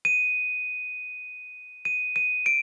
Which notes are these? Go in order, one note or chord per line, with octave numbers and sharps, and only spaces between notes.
D#7
D#7
D#7
D7